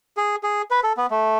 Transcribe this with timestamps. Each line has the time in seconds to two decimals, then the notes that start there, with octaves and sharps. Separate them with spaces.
0.17 G#4
0.43 G#4
0.71 B4
0.84 A4
0.97 B3
1.11 A3